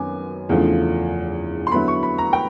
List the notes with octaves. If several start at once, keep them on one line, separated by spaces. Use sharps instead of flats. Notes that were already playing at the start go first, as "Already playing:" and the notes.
Already playing: F#2 D#3 B3 G#5 D6
E2 C#3 F3 A3 D4
C6
D3 F#3 B3 E4 B5
C#6
B5
A#5
G5